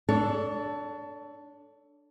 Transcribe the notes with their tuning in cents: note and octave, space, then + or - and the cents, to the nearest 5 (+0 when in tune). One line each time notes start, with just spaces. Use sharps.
D4 +0 A4 +0 C#5 +30